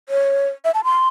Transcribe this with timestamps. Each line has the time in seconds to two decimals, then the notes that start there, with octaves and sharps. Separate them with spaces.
0.09 C#5
0.65 E5
0.74 A5
0.84 C6